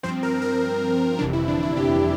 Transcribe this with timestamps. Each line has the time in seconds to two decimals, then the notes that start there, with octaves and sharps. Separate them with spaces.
0.03 G2 F3 C4 C5
0.23 A#4
0.42 A#4
1.19 G1 F2 C3 E3 D4
1.33 E4
1.48 D4
1.63 E4
1.77 G4